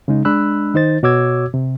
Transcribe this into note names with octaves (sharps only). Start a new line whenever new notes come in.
C#3 G#3 D#4
G#3 D4 B5 E6 F#6
D#3 D#4 C5 A6
B2 F#4 C#5 D6 E6 G#6
C3